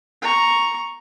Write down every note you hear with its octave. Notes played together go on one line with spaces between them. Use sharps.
A#5 C#6